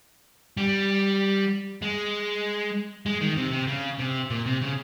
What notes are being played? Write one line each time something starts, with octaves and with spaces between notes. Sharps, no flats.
G3
G#3
G#3
D#3
C3
C3
C#3
C3
A#2
C3
C#3